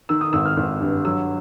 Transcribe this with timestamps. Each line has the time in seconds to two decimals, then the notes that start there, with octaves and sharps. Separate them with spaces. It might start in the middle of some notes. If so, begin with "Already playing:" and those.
0.09 D#3 E6
0.21 D#6
0.33 G#1 E6
0.45 F6
0.57 G#1
0.81 G2
1.05 F#3 E6